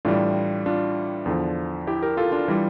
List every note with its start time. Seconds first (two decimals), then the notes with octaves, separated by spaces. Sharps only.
0.05 A2 E3 G3 D4 F4
0.66 D4 F4
1.26 E2 D3 F3
1.87 E4 G4
2.02 G4 A#4
2.17 F4 A4
2.32 D4 F4
2.48 E3 G3